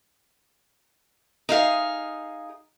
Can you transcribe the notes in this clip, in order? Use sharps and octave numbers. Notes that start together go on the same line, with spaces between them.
D#4 G#4 F5